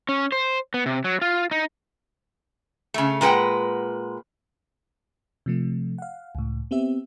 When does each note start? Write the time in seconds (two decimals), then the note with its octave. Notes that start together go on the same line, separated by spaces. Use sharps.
0.09 C#4
0.32 C5
0.74 B3
0.86 C3
1.04 F#3
1.22 F4
1.51 D#4
2.94 C#3 A3
3.21 A#2 G#3 B4 F#5 G5
5.46 C3 F3 A3
5.98 F5 F#5
6.35 C#2 A2
6.71 B3 C4 G4 E5